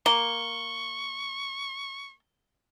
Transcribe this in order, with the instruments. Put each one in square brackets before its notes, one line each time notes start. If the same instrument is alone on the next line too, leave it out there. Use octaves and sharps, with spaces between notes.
[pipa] A#3 [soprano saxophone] C#6 [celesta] G7